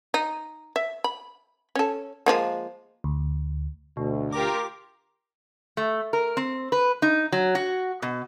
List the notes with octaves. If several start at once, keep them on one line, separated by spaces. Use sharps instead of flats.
D#4
E5
B5
C#4 A4
F3 G#3 A#3
D2
D2 B2
F4 G4 A#4 D6
A3
A#4
C4
B4
D#4
F#3
F#4
B2